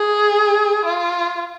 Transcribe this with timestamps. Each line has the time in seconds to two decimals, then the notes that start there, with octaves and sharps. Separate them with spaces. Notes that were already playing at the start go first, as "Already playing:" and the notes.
Already playing: G#4
0.85 F4